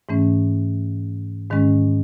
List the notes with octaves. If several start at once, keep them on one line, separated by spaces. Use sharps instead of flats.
G#2 E3 A3 C#4
G#2 D#3 G#3 C#4